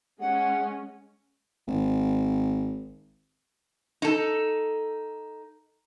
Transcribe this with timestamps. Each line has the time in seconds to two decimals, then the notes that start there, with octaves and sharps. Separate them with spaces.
0.20 G#3 C#4 F#5
1.67 G#1
4.02 D#4 A4